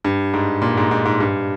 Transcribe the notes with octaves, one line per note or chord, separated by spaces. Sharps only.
G2
G#2
A#2
G#2
G#2
G#2
G2